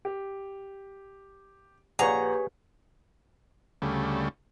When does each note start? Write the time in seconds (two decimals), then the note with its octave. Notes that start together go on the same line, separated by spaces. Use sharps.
0.05 G4
1.99 A#1 G4 G#4 B4 C#5 F#5 A#5
3.82 D2 C#3 G3 A3